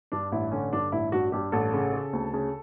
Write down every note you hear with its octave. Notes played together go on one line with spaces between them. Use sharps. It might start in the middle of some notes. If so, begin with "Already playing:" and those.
G2 D4
A1 E4
D3 C#4
G2 D4
A1 E4
G2 F#4
G2 G4
A1 A4
C#3
C#3
D2
C#3